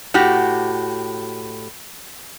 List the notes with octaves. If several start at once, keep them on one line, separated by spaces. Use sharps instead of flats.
A2 F#4 G4